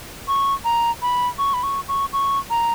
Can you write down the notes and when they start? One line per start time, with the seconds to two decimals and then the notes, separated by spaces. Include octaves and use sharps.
0.28 C#6
0.65 A#5
1.02 B5
1.39 C#6
1.54 B5
1.63 C#6
1.88 C#6
2.13 C#6
2.50 A#5